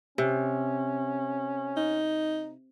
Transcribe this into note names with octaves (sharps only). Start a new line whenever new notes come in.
C3 C#4
D#4